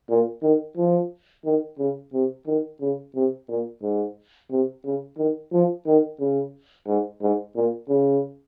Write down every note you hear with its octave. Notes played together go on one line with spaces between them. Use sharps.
A#2
D#3
F3
D#3
C#3
C3
D#3
C#3
C3
A#2
G#2
C3
C#3
D#3
F3
D#3
C#3
G#2
G#2
A#2
C#3